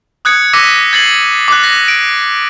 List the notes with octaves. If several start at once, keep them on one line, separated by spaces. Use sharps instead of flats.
D#6 F#6 G#6 C#7
D6 E6 A#6 B6 D#7
G#6 A6 C7 F#7
D6 F#6
F#6 A#6
D7